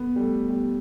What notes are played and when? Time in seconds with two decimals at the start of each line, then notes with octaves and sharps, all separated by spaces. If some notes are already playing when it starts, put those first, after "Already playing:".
Already playing: B3
0.16 G3
0.21 A3
0.49 G3